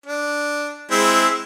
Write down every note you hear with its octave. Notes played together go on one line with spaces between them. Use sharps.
D4
G#3 C4 E4